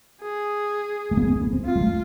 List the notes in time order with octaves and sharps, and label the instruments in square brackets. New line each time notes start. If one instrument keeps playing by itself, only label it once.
[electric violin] G#4
[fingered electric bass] A3
B3
A3
B3
C4
[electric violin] F4
[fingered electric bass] G#3
A3